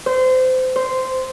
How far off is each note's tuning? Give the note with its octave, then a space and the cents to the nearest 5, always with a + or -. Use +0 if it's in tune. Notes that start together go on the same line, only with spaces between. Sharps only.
C5 -25
C5 -10